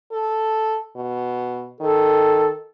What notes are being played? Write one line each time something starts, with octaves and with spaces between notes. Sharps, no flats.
A4
B2
D#3 A4